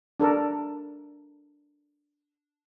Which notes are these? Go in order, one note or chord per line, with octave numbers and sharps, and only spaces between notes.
D4 A4 A#4